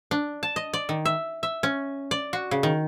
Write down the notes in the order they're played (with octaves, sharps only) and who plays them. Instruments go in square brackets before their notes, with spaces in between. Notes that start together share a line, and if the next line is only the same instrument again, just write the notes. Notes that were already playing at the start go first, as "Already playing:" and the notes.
[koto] D4
A5
D#5
D5
D#3
E5
E5
C#4
D5
F#4
C#3
D#3